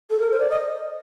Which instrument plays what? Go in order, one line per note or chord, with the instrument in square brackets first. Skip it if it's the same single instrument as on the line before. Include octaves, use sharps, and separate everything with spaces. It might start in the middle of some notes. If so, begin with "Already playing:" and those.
[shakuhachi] A4
A#4
C5
D5
D#5